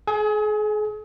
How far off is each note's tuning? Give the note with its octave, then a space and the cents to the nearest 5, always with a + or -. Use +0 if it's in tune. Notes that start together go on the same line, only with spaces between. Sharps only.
G#4 +40 G#5 +0